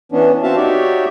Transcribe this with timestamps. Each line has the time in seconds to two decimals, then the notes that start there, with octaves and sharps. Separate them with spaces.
0.12 E3 B3 C#4 D4
0.43 C4 F#4 E5 F5 A5
0.56 D#4 F#4 G4 C#5 D5 E5